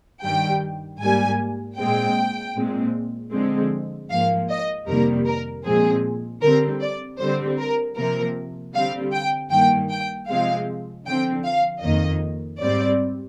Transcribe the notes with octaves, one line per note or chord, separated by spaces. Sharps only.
G2 D#3 G3 G5
G#2 G3 A#3 G#5
A#2 G#3 C4 G5
A#2 G#3 C4
D3 F3 G#3 C4
G#2 F3 A#3 F5
D#5
F2 C3 D#3 G3 A#3 A#4
A#4
A#2 F3 G#3 C4 G#4
D3 G3 C4 A#4
D5
D3 G3 C4 C5
A#4
C3 F3 A#3 A#4
D3 G3 C4 F5
G5
G2 D#3 A#3 G5
G5
C3 F3 G#3 C4 F5
D3 F3 C4 G5
F5
F2 D#3 A#3 D#5
G#2 G3 C4 D5